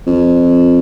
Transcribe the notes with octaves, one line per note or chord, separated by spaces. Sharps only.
F2